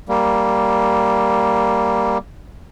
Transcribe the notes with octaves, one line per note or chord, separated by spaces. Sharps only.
G3 A#3